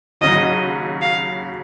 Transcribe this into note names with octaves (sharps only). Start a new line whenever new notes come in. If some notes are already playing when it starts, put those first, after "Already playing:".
D#2 C#3 F#3 D#5
F5